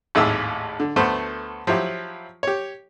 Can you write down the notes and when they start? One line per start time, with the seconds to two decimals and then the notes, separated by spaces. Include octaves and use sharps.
0.15 G#1 D#2 A2 G#4 E5 E6
0.80 D3
0.96 D2 A3 B3 C5
1.67 F3 F#3 E4 G4
2.43 G4 C#5